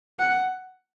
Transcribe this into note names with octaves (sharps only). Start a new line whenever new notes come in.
F#5